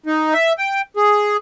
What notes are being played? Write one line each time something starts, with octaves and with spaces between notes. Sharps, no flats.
D#4
E5
G5
G#4